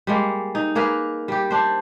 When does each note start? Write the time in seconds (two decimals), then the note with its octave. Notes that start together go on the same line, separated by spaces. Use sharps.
0.07 G3 G#3 A#3
0.55 D#4
0.75 A#3 G#4 A#4 B4
1.28 G3 G4
1.50 D4 C5